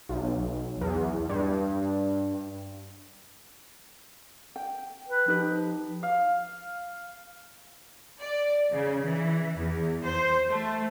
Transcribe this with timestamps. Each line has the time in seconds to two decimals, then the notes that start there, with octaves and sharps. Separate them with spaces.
0.09 B1
0.81 E2
1.29 G2
4.56 G5
5.09 B4
5.28 F3 D#4 G4 B4
6.03 F5
8.22 D5
8.71 C#3
9.03 E3
9.57 E2
10.04 C5
10.50 A3